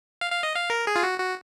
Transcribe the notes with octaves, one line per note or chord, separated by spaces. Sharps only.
F5
F5
D#5
F5
A#4
G#4
F4
F#4
F#4